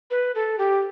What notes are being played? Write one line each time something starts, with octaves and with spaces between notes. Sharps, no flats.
B4
A4
G4